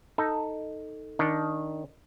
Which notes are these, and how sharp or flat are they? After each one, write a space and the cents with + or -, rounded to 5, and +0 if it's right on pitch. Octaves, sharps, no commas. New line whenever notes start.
D#4 +0 A4 +10
D#3 +0 D4 -10